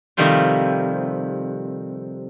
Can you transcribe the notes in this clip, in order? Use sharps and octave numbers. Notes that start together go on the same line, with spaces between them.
C3 D#3 F3 G3 A3 F4